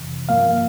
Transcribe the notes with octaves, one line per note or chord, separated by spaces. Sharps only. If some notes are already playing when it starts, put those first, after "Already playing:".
Already playing: F2 C3 E3
G2 F3 A#3 F5